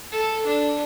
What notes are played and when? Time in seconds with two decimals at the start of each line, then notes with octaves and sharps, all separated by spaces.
0.12 A4
0.46 D4